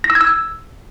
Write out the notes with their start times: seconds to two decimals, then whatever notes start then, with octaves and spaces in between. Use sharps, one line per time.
0.04 A#6
0.10 E6
0.15 G#6
0.21 E6